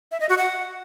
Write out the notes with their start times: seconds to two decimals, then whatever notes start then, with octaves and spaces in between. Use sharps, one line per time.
0.11 E5
0.20 D#5
0.29 F#4
0.38 F#5